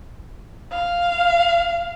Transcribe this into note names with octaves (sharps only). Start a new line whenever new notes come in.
F5